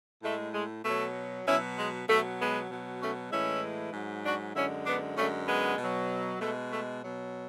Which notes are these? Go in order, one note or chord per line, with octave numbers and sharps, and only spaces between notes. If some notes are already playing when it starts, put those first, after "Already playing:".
A2 G#3 A3
G#3
B2 F#3 A3
B2 F#3 C#4 E4
G#3
B2 F#3 A3
G#3 B3
B2 F#3
A3 C#4
A2 E3 G#3 C#4 E4
G#2 F#3
D4 F#4
F#2 D3 G#3 C#4 E4
B3 D4
F#2 D3 G#3 A3 C#4
G#3 B3
B2 F#3
B2 G#3 A3
A3
B2 F#3